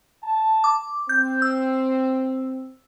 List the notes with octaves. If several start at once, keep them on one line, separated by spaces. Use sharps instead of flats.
A5
D6
C4 G6
E6